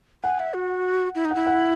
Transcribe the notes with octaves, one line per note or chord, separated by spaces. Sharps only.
F#5 G#5
E5
F#4
E4
D#4
F#5
E4
F#5